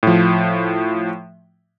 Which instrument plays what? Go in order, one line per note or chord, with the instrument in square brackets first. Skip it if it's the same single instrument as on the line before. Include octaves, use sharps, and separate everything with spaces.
[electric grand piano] A2 F3